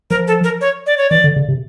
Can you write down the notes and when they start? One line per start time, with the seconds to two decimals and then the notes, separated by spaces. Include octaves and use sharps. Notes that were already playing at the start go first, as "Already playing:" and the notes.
0.10 F3 A#4
0.27 A4
0.44 A#4
0.61 C#5
0.86 D5
0.98 C#5
1.10 E3 D5
1.24 D3
1.36 C#3
1.49 C3